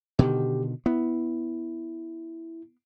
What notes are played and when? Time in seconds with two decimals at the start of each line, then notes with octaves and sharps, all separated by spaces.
0.19 B2 D3 D#3 G4
0.86 B3 E4